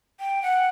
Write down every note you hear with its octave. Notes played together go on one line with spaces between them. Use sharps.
G5
F#5